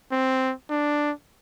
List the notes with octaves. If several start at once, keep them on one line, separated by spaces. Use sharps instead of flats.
C4
D4